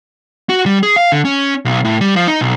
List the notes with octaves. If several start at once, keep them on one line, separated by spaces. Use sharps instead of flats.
F#4
G3
G#4
F5
D3
C#4
B1
A2
G3
F3
D#4
B1